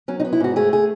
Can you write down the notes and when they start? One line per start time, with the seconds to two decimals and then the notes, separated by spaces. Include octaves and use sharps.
0.08 F#3 C#4
0.20 D#4
0.25 B3
0.33 E4
0.40 G#2 F#4
0.56 A3 G#4
0.73 G#4